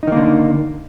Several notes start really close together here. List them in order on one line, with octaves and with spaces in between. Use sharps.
D#4 D#3 A#3 D3